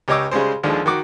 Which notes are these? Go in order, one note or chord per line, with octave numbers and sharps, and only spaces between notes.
C#2 G4 C#5 D#5 D6 E6
C#3 G3 G#3 C5
D#2 D3 F3 G#3
D#3 F#4 D6